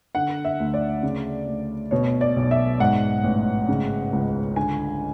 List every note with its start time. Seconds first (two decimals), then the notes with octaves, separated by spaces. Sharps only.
0.15 D3 F#5
0.45 E5
0.60 D2
0.74 D5
1.03 C#3
1.47 D2
1.91 B2 C#5
2.21 D5
2.36 B1
2.51 E5
2.79 G#2 F#5
3.24 A1
3.68 C#3
4.13 C#2
4.56 D3 G#5